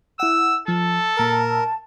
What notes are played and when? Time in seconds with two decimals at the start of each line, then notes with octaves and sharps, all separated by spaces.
0.20 E4 F#5 E6
0.68 F3 A4
1.17 A#2 A#4 A5 E6